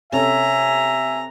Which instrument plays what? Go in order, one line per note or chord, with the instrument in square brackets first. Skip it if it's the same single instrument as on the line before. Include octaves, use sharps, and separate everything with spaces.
[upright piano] C3 C#4 A4 [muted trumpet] E5 [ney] G#5 [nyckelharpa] A#5